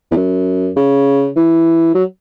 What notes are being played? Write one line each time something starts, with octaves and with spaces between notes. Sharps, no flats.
E2
F#2
C#3
E3
F#3